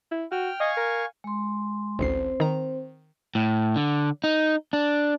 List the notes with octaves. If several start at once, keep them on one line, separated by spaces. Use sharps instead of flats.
E4
F#4 G5 F6
D#5 F5 G#5 C#6
A#4
G#3 C6
A1 D2 C4 C5 C7
D#3 A#5
A2
D3
D#4
D4